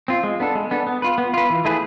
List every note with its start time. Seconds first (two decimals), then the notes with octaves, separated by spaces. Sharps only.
0.08 C4 F4
0.23 G#3
0.40 B3 D4 A4
0.55 G#3
0.71 B3 D4 A4
0.87 B3
1.02 F4 B4
1.18 B3
1.34 F4 B4
1.50 E3
1.65 A3 E4 G#4 B4